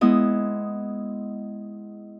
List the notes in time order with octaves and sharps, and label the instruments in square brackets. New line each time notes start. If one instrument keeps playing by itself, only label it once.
[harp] G#3 B3 E4 D#5